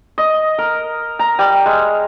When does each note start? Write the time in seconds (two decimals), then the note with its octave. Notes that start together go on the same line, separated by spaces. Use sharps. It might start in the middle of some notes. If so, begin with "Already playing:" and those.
0.18 D#5
0.58 A#4
1.19 A#5
1.39 G3
1.66 G#3